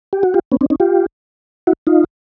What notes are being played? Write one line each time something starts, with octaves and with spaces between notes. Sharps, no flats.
G4
F#4
F4 G4
B3 C#4
C4 D4
C#4 D#4
F4 G4
E4 F#4
D#4 F4